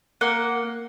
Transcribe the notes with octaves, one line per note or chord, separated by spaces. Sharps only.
A#3 F#5